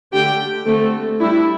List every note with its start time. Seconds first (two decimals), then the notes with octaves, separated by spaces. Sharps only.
0.13 D3 A3 D4 G4 G5
0.66 D3 A3 C4 A4
1.19 G3 D4 E4